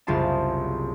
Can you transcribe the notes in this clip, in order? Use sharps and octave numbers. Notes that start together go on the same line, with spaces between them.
F#1 C2 F4 G#4 A5